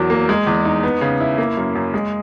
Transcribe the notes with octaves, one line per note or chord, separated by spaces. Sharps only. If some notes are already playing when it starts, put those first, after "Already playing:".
Already playing: E2 F#3 A#4
A#3
G#3
E2
D#4
B3
C#3
E4
A#3
F#2
F#2
G#3